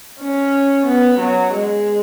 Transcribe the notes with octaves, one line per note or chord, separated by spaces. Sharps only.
C#4
B3
F#3
G#3